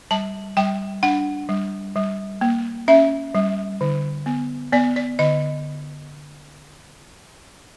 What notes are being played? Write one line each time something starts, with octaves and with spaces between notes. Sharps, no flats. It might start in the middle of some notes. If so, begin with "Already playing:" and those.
G3 A5
G3 G5
D4 F#5
G3
G3
A#3
C#4 E5
G3
D3
B3
B3 D5
D5
D3 D#5